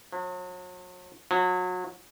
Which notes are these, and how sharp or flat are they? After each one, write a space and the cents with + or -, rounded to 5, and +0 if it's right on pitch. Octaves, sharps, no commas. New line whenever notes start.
F#3 -40
F#3 -30